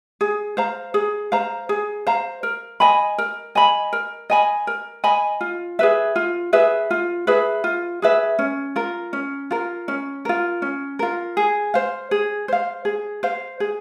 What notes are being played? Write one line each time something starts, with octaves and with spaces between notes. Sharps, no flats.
G#4
C5 F5 A#5
G#4
C5 F5 A#5
G#4
C5 F5 A#5
A#4
D#5 G#5 B5
A#4
D#5 G#5 B5
A#4
D#5 G#5 B5
A#4
D#5 G#5 B5
F4
G#4 B4 E5
F4
G#4 B4 E5
F4
G#4 B4 E5
F4
G#4 B4 E5
C#4
F4 A#4
C#4
F4 A#4
C#4
F4 A#4
C#4
F4 A#4
G#4
C5 F5
G#4
C5 F5
G#4
C5 F5
G#4